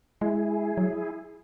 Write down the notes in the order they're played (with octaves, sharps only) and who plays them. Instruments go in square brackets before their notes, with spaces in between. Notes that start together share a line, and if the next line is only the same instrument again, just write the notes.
[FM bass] G#3 [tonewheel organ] E4 G#4
[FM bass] F#3